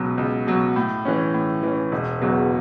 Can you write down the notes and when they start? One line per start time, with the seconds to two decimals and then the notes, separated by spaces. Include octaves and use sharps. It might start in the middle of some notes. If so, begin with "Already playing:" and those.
Already playing: C#2 B2 F#3
0.18 C#2
0.47 B2 F#3
0.76 A2
1.05 E3 C#4
1.34 A2
1.63 E3 C#4
1.92 E1
2.21 E2 C#3 F#3 B3